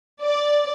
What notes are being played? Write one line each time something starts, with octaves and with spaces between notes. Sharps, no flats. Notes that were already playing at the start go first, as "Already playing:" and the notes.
D5